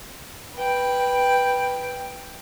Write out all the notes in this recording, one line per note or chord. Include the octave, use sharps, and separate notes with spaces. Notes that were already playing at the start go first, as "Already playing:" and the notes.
B4 G5